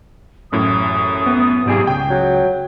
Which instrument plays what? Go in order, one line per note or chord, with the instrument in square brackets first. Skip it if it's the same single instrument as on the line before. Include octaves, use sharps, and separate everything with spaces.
[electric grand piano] A1 F#2 A2 [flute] D#6
[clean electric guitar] B3
G#2 G4 G#4
[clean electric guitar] C#2 [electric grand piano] G5
[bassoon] F#3